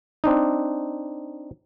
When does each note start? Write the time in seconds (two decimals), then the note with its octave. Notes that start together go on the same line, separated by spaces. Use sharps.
0.24 C4 D4 D#4